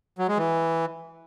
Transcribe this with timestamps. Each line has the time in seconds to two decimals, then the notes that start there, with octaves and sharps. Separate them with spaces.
0.18 F#3
0.28 G#3
0.38 E3